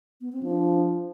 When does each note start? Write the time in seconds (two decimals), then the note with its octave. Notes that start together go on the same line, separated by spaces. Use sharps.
0.21 B3
0.32 C4
0.42 F3 D4